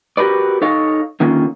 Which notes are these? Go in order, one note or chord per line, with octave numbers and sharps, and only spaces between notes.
F#4 G4 A#4 B4 D5
D#4 A4 C#5 D#5 F5
D3 D#3 A#3 C#4 F4